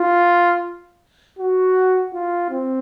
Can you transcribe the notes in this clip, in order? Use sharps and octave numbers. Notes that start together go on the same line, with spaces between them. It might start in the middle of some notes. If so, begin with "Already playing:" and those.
Already playing: F4
F#4
F4
C4